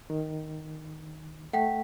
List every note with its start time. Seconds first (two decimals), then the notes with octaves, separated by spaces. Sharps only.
0.10 D#3
1.53 A3 F#5 G5 B6